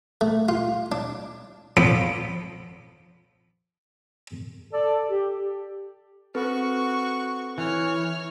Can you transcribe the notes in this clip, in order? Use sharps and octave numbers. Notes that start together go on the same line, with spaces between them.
A3
F4
D4
F3 B3 A4 B5 D6
A4 D5
G4
C4 F#4 A4 B4 C#6
E3 C#5 F6